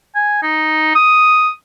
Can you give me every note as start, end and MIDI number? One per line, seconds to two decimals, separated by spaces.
0.15 0.41 80
0.43 0.94 63
0.95 1.51 87